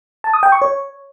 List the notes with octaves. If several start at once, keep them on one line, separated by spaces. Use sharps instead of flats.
A5
D#6
G5
C#6
C#5